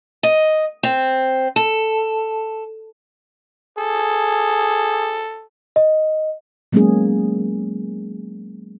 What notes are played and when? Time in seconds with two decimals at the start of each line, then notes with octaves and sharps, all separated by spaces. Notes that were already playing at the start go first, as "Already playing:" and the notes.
0.23 D#5
0.83 C4
1.56 A4
3.78 G#4 A4
5.76 D#5
6.72 F#3 G#3 A#3 B3 C#4 G#4